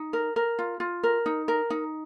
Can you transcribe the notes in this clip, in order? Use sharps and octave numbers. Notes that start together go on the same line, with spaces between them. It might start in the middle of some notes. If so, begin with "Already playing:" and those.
Already playing: D#4
A#4
A#4
F4
F4
A#4
D#4
A#4
D#4